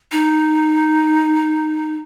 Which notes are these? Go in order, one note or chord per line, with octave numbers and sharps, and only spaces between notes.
D#4